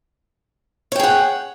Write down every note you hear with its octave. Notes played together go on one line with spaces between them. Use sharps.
G#4 C#5 F#5 G5